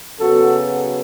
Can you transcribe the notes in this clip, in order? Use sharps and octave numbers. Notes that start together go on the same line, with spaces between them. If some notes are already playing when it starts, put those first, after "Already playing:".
C#3 F#3 B3 F#4 A4